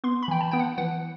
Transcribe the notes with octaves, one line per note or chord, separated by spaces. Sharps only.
B3 C6
B5
E3 G5
A5
B3 G5
F#5
E3 F#5